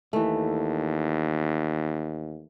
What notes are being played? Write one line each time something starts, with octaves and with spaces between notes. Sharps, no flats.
D#2 E3 A3